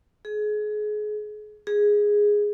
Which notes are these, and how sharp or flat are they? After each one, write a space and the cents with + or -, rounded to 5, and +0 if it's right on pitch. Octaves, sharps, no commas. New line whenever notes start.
G#4 +30
G#4 -5